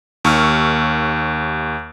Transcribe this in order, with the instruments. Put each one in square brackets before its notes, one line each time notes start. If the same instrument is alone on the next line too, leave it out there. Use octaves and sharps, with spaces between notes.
[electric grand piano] D#2 C#6 E6 F6